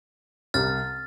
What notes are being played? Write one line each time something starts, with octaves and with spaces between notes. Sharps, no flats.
C2 C3 G3 F6 A6